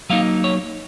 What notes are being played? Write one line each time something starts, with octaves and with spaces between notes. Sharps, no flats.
F#3 A#3 D#4 F5
C#5